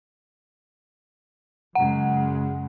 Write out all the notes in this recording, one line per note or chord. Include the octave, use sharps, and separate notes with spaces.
F#2 C#3 G#3 F#5